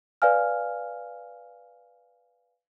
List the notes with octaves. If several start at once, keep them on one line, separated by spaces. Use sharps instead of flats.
B4 D5 F5 G#5 F6